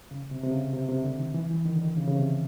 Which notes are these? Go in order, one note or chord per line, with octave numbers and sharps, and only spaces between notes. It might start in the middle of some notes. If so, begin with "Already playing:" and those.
C#3
C3
C3
C#3
C3
C3
D3
D#3
E3
E3
D#3
D3
D#3
C#3
C#3
C3